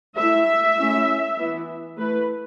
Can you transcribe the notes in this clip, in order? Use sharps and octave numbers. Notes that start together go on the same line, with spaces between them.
A3 E4 E5
A3 C#4 E4
E3 B3 E4
A3 E4 B4